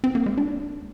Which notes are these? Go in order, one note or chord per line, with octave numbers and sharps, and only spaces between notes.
C4
A#3
G#3
D4